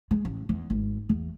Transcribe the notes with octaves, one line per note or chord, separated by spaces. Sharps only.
G#3
A1
E2
G#1
E2